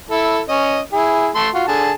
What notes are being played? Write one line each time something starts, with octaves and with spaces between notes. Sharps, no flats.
E4 A4
C#4 D#5
E4 G#4
A3 A5 C6
F4 F#4
D3 G#4 A5